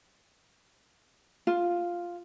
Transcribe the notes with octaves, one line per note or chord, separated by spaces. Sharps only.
F4